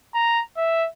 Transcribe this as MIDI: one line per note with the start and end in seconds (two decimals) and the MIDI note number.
0.14 0.41 82
0.56 0.86 76